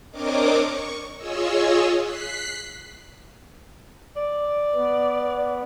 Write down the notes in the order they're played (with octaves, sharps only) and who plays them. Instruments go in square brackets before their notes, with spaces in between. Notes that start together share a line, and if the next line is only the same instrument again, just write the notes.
[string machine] C4 D4 A#4 C#5 D#5 D6
C#6
F4 G#4 C#5 D#5 E6
F#6 B6 C7
[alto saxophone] D5
[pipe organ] B3